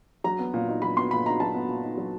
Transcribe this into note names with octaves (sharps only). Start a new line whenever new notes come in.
F#3 A#5
B3
A#2
D#4
F#3 B5
B3 C6
A#2 B5
D#4 A#5
F#3 A5
B3
A#2
D#4
F#3